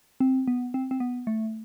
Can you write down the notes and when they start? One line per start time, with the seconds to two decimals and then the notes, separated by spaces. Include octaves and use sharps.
0.20 C4
0.48 B3
0.74 C4
0.91 C4
1.00 B3
1.27 A3